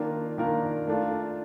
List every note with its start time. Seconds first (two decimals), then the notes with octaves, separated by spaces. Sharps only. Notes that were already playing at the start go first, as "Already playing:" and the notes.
Already playing: D#3 A#3 D4 F4 A#4
0.38 D#3 A#3 D4 F4 A#4
0.87 A3 D4 F4